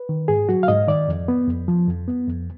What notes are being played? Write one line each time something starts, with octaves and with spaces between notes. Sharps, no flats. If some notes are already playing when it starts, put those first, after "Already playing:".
Already playing: B4
D#3
G#2 G#4
F#3 F#4
F5
G#2 D#5
D#3 D5
F2
B3
F2
F3
F2
B3
F2